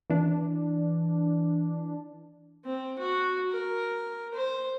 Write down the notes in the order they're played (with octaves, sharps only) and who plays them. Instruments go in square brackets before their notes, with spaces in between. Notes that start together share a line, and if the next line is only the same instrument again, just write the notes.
[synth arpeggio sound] E3 D4
[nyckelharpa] C4
F#4
A#4
C5